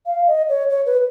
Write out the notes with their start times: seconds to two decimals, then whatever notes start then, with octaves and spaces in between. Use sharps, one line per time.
0.06 F5
0.27 D#5
0.49 C#5
0.70 C#5
0.86 B4